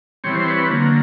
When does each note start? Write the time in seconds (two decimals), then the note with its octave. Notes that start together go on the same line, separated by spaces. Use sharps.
0.24 E3 G3 C4 C#5
0.35 C5
0.48 B4 C#5
0.70 D3 F#3 A#3